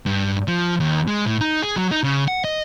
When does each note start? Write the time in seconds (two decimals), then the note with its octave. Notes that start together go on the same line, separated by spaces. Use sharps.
0.06 G2
0.48 F3
0.80 D#2
1.08 G#3
1.26 A2
1.41 D#4
1.63 G#4
1.76 F#3
1.91 D#4
2.03 C#3
2.28 F#5
2.44 D#5